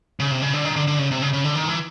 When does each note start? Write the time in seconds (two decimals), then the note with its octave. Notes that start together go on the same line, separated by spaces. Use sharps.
0.20 C#3
0.31 C3
0.42 C#3
0.54 D3
0.65 D#3
0.76 D3
0.87 D3
0.99 C#3
1.11 C3
1.22 C#3
1.33 C#3
1.44 D3
1.55 D#3
1.68 E3